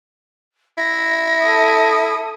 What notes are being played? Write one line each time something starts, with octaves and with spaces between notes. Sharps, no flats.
E4 A#6
A4 D#6